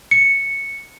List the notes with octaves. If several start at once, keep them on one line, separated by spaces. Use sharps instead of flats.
C#7